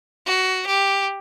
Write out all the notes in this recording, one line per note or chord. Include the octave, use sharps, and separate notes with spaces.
F#4
G4